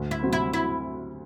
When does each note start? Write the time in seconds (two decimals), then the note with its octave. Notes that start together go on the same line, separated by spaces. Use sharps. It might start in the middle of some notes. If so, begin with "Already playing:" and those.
Already playing: D2
0.11 E4
0.22 C3 F#3 C4
0.33 E4
0.54 E4